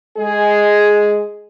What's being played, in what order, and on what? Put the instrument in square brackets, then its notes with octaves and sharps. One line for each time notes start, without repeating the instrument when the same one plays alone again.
[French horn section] G#3 G#4